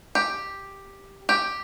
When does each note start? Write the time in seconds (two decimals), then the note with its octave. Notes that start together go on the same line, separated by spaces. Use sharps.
0.15 G4
1.29 G4